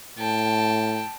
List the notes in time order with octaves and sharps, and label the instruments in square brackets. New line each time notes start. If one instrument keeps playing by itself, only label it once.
[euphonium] A2 [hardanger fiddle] G5 A5